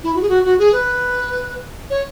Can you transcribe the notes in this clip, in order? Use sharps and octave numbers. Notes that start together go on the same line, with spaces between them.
E4
F#4
G#4
F#4
F#4
G#4
B4
C#5